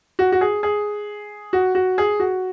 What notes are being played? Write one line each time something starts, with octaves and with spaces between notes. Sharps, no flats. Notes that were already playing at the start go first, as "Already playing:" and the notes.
F#4
F#4
G#4
G#4
F#4
F#4
G#4
F#4